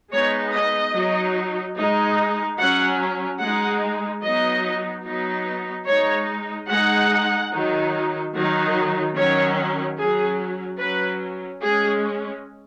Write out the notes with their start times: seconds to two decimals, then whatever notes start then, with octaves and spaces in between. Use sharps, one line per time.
0.12 G#3 B3 D#4 C#5
0.53 D#5
0.95 F#3 D#4
1.77 G#3 D#4
2.59 F#3 C#4 F#5
3.41 G#3 D#4 F#5
4.23 F#3 B3 D#4 D#5
5.05 F#3 B3 D#4
5.87 G#3 D#4 C#5
6.69 G#3 D#4 F#5
7.52 D#3 F#3 D#4
8.34 D#3 F#3 D#4
9.16 D#3 F#3 C#4 C#5
9.98 F#3 C#4 G#4
10.80 F#3 C#4 B4
11.62 G#3 C#4 G#4